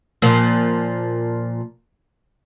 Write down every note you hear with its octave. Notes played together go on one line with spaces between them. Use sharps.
A#2 F3